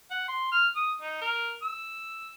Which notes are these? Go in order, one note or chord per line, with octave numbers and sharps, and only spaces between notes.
F#5
C6
F6
D#6
D#4
A#4
E6